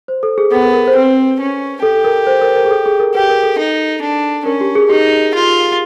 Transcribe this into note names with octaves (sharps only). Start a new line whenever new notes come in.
C5
A4
G#4
B3 A4
A#4
A#4
C5
C4 B4
C#4
G4 A4
A#4
C5
A#4
A#4
G#4
A4
G#4
A#4
G4 B4
A#4
A4
D#4
D4
C#4 A#4
G4
G#4
D#4 G4
F4